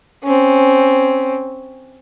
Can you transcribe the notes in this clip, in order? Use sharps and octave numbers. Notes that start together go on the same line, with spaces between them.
C4 C#4